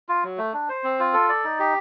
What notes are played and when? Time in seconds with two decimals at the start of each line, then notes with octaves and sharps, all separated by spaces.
0.09 F4
0.24 F#3
0.38 A3
0.54 D4
0.69 C5
0.84 C4
0.99 F4
1.14 A4
1.29 D5
1.44 D#4
1.60 G4